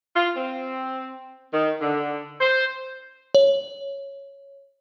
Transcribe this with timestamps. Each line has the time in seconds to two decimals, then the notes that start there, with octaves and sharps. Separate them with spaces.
0.15 F4
0.36 C4
1.53 D#3
1.81 D3
2.41 C5
3.35 C#5